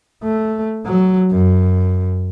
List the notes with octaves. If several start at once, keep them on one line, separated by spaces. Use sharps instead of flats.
A3
F#3
F#2